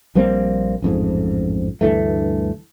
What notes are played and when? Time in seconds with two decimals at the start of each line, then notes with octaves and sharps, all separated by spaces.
0.15 A#1 G3 A#3 C4
0.82 A1 F2 G#2
1.81 D2 G2 E3 A3